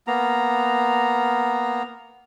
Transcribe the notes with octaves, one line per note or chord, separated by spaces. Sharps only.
A#3 B3 A#5